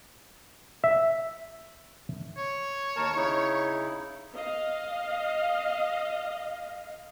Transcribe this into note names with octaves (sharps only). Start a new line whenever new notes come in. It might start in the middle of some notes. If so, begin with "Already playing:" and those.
E5
C#5
D#2 A#4 A5
C#3 D#4 E4
D#5 F5